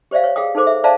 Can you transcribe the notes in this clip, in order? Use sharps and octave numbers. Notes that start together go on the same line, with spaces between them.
G4 C5 D5 E5 F5
C#5
G#4 F5 G5 D#6
D#4 G#4 A4 C5 D6
E5
C5 D5 E5 F5 A5 A#5